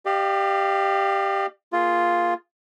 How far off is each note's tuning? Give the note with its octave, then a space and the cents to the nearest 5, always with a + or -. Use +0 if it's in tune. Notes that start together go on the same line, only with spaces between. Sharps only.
G4 +0 D5 +45 F5 -15
A#3 +0 F4 +0 G#4 +0